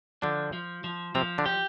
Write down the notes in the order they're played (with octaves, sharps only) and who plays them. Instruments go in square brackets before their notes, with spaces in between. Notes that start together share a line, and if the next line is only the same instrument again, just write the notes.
[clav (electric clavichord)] D3 D4 [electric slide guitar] F3
[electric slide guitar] F3
F3
[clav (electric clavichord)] C3 C4 [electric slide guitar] F3
[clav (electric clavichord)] D3 D4
[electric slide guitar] G4